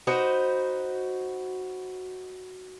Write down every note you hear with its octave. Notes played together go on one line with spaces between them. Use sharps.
D#4 F#4 B4 C5